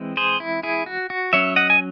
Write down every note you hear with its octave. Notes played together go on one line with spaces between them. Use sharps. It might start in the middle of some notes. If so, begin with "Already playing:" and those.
Already playing: E3 G#3 C4
G#4 C5
E4
E4 G#4
F#4
F#4
F#3 C#4 C#5 E5
D#5 F#5
G#5